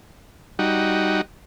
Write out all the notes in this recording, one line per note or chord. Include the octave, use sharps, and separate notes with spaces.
G3 D#4 F#4